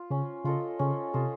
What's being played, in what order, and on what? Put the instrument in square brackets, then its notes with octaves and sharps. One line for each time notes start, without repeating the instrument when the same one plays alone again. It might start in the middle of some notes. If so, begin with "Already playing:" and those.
Already playing: [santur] F4
[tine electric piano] C#3 [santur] C#4
[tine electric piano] C#3 [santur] F4 A4 D#5
[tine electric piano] C#3 [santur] C#4
[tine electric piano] C3 [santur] F4 A4 D#5